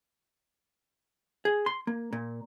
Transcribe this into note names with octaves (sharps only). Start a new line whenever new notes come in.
G#4
C6
A#3
A#2